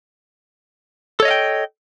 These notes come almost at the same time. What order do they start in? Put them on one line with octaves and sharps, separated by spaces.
A4 C#5 D#5 F5 G5